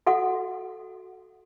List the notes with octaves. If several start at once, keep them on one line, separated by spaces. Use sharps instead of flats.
F#4 A4 F#5